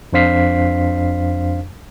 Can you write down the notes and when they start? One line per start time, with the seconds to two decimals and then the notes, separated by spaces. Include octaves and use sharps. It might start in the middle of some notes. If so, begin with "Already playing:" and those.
0.13 F2 D4 C5 F5 B6 C7